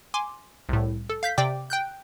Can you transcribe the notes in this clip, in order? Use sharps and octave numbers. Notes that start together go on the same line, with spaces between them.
G#5 C6 D6
C2 A2
A4
F5 G6 B6
C3 D5 G5 D6
G5 F#6 G6